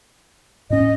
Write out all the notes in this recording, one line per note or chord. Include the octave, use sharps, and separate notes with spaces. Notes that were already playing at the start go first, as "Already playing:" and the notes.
A2 C#4 D#5